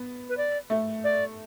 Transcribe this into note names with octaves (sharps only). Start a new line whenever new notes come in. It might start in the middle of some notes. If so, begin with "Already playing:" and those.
Already playing: B3
B4
D5
A3
D5